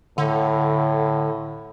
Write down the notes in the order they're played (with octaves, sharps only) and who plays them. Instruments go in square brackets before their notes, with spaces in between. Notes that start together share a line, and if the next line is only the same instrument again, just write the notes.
[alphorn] A2 [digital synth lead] D3